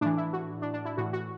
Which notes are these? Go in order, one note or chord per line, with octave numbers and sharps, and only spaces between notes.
A2 E3 D4
E4
F#4
D4
D4
E4
A2 E3 F#4
F#4